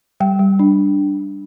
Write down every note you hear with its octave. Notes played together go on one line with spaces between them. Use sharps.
G3 G5
G3
D4